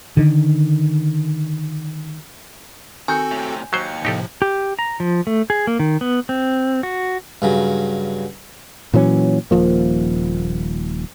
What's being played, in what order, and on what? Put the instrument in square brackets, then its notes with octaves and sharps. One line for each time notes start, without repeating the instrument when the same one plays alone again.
[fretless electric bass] D3 D#3
[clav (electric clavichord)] D#3 [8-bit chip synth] C4 F#4 A4 [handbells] G#5 G6
[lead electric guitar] A2 C3
[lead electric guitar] D#2 [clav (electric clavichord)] F#3 C5 [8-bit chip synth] C#7
[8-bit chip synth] A2 C3 F3 [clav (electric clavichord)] D#4 G4 A4
[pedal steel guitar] G4
A#5
F3
A3
G#4
A#3
D#3
B3
C4
F#4
[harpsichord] G2 C#3 F#3
[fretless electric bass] A#2 E3 F#3 C#4
D#1 F3 A#3